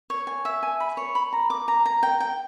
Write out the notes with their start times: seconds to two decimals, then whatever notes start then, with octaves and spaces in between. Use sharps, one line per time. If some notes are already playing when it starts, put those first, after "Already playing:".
0.10 C#5
0.27 G#5
0.45 E5
0.63 G#5
0.80 B5
0.97 C#5
1.15 B5
1.33 A#5
1.50 D6
1.68 A#5
1.86 A#5
2.03 G5
2.20 G5